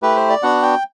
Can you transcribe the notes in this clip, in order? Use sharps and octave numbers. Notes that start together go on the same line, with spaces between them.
A3 E4 G4 B4
C5
D5
B3 D4 F#4 F#5
G5